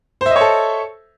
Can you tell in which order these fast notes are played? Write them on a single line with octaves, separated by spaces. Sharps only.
C5 E5 D#5 C#5 A4